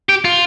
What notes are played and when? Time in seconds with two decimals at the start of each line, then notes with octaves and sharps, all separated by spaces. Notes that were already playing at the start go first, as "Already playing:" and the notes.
0.09 G4
0.25 F4